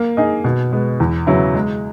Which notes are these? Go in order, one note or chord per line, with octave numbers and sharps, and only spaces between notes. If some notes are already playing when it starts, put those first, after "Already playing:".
Already playing: A#3
D#4 G#4 D#5
B2
G#3 B3
E2
C#3 F#3 B3 E4
G#3